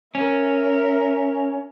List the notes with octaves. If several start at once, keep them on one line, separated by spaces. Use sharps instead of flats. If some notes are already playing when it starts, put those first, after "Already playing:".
C#4 A#4 E5